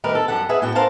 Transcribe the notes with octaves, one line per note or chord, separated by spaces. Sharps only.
D#3 G3 A3 A#4 B4
A4
F#2 G3 A4 F#5
G#4 B4 E5 F#5
A2 B3 F#4 G5
A4 A#4 C5 F5 F#5 A5